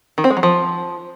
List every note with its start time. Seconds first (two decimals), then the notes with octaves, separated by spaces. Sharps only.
0.18 D#3
0.24 C4
0.30 G#3
0.37 F#3
0.43 F3